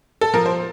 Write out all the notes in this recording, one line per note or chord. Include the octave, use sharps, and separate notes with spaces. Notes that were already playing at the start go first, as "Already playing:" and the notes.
A4
F3 A#4
C5